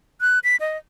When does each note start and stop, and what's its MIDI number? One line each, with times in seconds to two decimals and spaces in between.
0.21 0.39 90
0.44 0.56 95
0.60 0.77 75